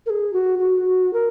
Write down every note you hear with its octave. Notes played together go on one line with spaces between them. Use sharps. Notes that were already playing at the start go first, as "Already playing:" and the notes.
A#4
G#4
F#4
F#4
A#4